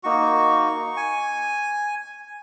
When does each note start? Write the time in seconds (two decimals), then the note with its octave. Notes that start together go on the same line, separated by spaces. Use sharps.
0.03 A#3 D#4 F#4 C#6
0.97 G#5